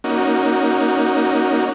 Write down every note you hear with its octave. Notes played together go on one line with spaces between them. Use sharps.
A#3 C#4 D#4 F#4